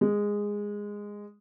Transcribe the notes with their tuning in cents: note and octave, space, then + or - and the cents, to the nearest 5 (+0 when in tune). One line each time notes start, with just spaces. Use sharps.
G#3 -10